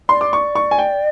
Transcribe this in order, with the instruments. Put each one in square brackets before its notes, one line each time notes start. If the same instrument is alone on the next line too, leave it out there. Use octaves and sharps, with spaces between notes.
[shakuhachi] D5 [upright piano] C6
[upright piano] D6
C#6
C#6
G#5
G5